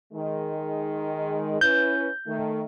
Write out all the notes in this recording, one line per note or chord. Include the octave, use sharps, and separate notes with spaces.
D#3 G#3
C#4 E4 B4 G6
D#3 A3